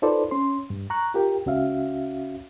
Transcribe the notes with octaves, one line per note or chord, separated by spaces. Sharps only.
D#4 F4 A4 B4 C5 D5
C#4 C6
G2
A#5 C#6 F#6
F4 G4 A#4 G5
C#2 C#4 F#4 E5 F5